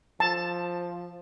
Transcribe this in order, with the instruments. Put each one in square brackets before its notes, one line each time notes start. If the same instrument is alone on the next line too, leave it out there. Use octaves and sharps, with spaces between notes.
[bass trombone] F3 [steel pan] A5